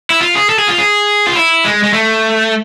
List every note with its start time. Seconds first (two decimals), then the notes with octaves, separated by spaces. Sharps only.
0.10 E4
0.21 F4
0.35 G#4
0.49 A4
0.59 G#4
0.68 F4
0.78 G#4
1.27 F4
1.35 E4
1.64 G#3
1.83 G#3
1.93 A3